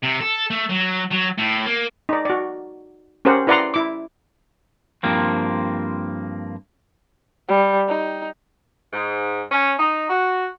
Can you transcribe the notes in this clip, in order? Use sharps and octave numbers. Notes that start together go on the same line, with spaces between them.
C3
A4
A3
F#3
F#3
A2
A#3
D#4 D5
F#4 D5
C#4 G4 A#4 C5 F#5
E4 B4 D5 F#5 A#5 C6
E4 D6
G2 F3 A#3 C4
G3
D#4
G#2
C#4
D#4
F#4